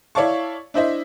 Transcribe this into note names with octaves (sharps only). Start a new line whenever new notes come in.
E4 C#5 D5 F5 A5 C#6
D4 E4 C5 D#5 E5